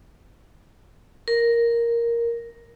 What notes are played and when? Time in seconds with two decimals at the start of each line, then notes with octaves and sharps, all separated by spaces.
1.28 A#4